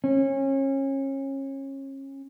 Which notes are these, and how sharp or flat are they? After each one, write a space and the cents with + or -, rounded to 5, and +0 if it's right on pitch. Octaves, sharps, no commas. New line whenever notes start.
C#4 -30